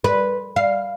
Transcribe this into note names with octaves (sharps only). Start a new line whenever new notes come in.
B4
F5